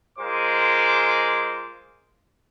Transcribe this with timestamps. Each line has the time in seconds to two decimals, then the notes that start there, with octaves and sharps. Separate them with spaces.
0.19 G#3 F4 G#4 A#4 C5 D6